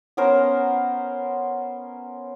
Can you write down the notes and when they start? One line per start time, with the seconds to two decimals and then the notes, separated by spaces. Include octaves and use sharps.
0.17 B3 C#4 A#4 C5